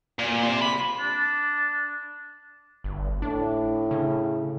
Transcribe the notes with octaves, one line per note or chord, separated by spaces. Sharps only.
A#2
G4 C6
B5
D4
G1
A2 D4
C#3